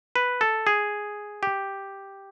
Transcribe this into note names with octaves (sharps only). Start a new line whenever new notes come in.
B4
A4
G#4
G4